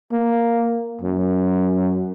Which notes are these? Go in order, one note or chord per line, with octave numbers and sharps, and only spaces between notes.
A#3
F#2